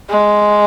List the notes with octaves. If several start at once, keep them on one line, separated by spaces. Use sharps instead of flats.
G#3